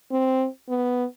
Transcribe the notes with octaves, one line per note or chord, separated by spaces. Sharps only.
C4
B3